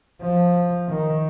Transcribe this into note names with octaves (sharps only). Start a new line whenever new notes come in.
F3
D#3